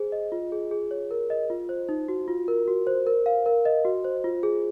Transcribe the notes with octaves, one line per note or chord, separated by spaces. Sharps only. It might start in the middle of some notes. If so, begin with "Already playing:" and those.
Already playing: G#4 C5
D#5
F4
G#4
G#4
C#5
A#4
D#5
F4
C5
D#4
F#4
F4
A#4
F#4
C5
A#4
F5
A#4
D#5
F#4
C5
F4
G#4